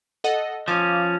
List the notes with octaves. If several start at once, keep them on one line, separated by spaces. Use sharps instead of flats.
A4 D#5 F#5
F3 C#4 F5 D6